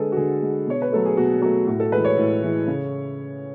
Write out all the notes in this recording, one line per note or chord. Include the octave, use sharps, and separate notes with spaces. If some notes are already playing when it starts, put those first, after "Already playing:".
Already playing: D3 G#3 G#4 A4 B4
F#4
D3 G#4
G#3
B2 C#5
B4
F#3 A3 A4
G#4
B2 F#4
F#3 A3 F#4
A2 F#4
A4
E3 G#3 B4
C#5
A2
E3 G#3
C#3